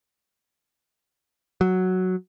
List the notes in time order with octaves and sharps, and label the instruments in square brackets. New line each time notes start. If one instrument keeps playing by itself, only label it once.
[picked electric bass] F#3